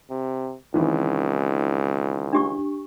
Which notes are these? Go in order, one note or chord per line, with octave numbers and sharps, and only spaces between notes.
C3
C#2 D#3 E3 C4
D4 G4 C#6